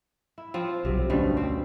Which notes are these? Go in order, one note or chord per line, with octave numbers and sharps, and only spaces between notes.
E4
F3 C4
B1 C3 F#3
D2 G2 B2 G3 C#4
C4